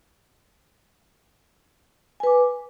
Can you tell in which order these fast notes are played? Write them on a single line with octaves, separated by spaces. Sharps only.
G#5 B4 D6